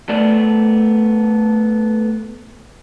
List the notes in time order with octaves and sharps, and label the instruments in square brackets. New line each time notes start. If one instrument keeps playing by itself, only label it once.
[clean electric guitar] A3 B3 D5